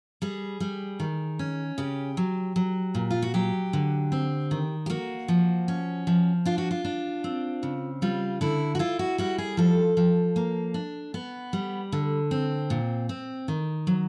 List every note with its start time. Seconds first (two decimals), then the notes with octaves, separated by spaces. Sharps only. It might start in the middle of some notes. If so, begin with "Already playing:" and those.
0.22 G3 G#4
0.60 G3
1.00 D#3
1.39 C#4
1.78 C#3 G4
2.17 F#3
2.56 F#3
2.95 A#2
3.10 F4
3.22 F#4
3.34 F#3 G4
3.73 D3
4.12 C4
4.51 D#3
4.86 G4
4.90 A#3 F#4
5.28 F3
5.68 C#4
6.07 F3
6.46 D4 F4
6.58 F#4
6.71 F4
6.85 D4
7.24 C4
7.63 C#3
8.02 G3 F4
8.41 D3 E4
8.75 F#4
8.79 E4 F4
8.99 F#4
9.18 G3 F#4
9.38 G#4
9.57 F3 A4
9.97 F3
10.36 A#3
10.74 D4
11.14 B3
11.53 G3
11.92 D3
12.31 C4
12.70 A#2
13.09 C4
13.48 D#3
13.87 F#3